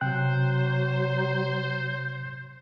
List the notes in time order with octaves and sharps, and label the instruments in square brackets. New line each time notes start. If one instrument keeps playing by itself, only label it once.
[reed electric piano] C3 G5 F#6 [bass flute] F#3 [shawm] C5